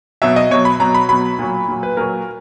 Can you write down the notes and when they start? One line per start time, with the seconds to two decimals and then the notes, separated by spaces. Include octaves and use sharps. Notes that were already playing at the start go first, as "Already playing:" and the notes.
0.22 B2 F#3 E5
0.36 D#5
0.51 B2 F#3 C#5
0.65 B5
0.80 B2 F#3 A#5
0.94 B5
1.09 B2 F#3 B5
1.39 A#2 F#3
1.68 A#2 F#3
1.83 B4
1.97 A#2 F#3 A#4